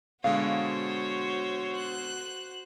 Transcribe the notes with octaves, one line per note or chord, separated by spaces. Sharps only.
B2 D3 G#3 F#4 C5 C#5 F5
F#6